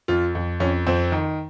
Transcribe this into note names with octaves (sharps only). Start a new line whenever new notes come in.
F2 F4
F2
F2 C#4
F2 C4
D#3